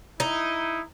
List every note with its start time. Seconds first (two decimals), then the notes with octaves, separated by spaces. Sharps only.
0.20 D#4 E4